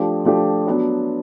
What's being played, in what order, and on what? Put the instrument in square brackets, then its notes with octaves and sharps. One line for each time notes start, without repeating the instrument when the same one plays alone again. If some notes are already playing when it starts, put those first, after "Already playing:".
Already playing: [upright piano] F3 A3 D4 G4
F3 A3 D4 G4
F#3 B3 D4